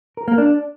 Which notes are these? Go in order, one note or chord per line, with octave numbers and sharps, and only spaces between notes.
A#4
A#3
D4